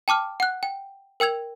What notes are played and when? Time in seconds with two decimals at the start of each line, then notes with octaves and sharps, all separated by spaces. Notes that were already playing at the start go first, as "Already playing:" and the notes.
0.08 G5 A5 D6 F6
0.40 F#5 F#6
0.63 G5
1.20 A#4 G5 E6 G#6 F7